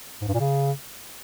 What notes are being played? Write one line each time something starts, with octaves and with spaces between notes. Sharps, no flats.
G#2
G2
A#2
C#3